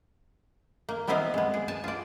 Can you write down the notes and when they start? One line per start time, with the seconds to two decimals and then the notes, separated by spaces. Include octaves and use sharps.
0.89 A#3
1.07 G3 B3 C4 E4 D#5 F5
1.34 G#3 B3
1.54 G#4
1.68 G#5 A5
1.84 F4 D5